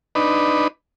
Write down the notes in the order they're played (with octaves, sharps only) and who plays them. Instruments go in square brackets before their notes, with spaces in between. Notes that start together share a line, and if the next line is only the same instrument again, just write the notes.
[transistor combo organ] D4 D#4 B4